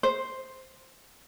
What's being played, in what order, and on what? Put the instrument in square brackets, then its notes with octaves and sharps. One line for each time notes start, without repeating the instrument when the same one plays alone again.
[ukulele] C5